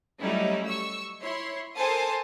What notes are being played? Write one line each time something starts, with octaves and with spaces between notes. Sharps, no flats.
F#3 G3 A3 C#4 D#4 E4
C#6 E6
E4 C#5 C6
A4 A#4 C5 G#5 A5 D#6